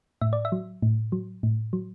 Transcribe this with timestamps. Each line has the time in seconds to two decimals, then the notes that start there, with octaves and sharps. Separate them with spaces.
0.21 A2 E5
0.33 D5
0.45 E5
0.52 F#3
0.82 A2
1.12 F#3
1.43 A2
1.73 F#3